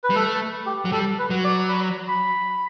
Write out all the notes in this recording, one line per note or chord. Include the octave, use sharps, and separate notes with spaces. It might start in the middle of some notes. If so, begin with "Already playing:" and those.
B4
G3
A3 A4
G4
F#3
G3 A4
B4
F#3
D5
B5
B5